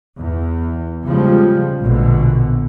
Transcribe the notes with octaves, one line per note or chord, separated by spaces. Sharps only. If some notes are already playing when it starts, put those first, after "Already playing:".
E2
C#3 F3 G3 G#3
A#1 B2 D3